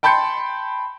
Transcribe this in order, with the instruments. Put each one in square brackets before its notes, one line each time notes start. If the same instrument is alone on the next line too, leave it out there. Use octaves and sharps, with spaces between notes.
[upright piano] G5 A5 B5 C6 G6 C#7